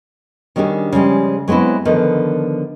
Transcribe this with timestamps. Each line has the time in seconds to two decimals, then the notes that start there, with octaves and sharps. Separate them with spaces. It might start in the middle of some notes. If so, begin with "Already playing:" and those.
0.56 D#3 G3 C#4 D4 G#4
0.92 C#3 F3 G3 G#3
1.48 F#3 G#3 B3 C4 E4
1.85 D3 D#3 F3 B3